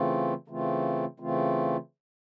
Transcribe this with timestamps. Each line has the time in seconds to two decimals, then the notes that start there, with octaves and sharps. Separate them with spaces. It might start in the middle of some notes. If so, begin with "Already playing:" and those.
Already playing: C#3 E3 A3 C4 F4
0.48 C#3 E3 A3 C4 F4
1.20 C#3 E3 A3 C4 F4